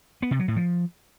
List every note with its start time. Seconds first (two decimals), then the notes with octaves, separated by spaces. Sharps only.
0.22 B3
0.31 C3
0.39 F#3
0.48 A2
0.56 F3